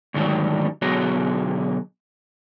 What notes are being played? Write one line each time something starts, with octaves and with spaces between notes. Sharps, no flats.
D2 G#2 D#3 F#3 G3
B2 D3 F#3 F#4 G#4